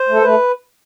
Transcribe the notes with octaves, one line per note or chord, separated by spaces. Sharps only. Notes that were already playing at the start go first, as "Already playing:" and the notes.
Already playing: C5
A3 A4
A3 B4